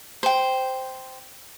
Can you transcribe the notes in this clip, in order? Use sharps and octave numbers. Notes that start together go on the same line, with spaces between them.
C5 G5